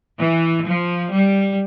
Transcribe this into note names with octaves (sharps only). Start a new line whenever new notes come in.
E3
F3
G3